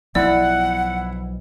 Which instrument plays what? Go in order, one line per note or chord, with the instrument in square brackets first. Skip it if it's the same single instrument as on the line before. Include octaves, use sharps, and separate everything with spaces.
[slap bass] B1 F3 B3 [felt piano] E4 [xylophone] D5 [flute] F#5